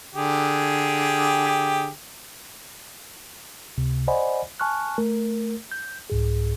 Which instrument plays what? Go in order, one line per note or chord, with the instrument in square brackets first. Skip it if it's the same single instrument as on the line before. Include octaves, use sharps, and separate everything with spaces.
[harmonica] D3 G4 G#4
[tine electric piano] C#2 C3
C5 D5 D#5 F#5 G#5 B5
G#5 A5 C#6 F6 F#6
A3 A#4
G6
C2 G#2 G#4